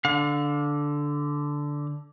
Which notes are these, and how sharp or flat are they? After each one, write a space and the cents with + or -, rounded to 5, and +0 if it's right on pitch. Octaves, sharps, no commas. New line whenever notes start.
D3 -5 F5 +40